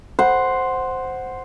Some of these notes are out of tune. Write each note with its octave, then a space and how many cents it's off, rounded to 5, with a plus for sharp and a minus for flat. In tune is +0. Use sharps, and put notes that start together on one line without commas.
C5 +0 F#5 +0